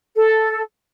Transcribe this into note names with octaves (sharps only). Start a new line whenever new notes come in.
A4